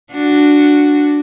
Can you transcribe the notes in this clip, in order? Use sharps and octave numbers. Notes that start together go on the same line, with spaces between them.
D4 F#4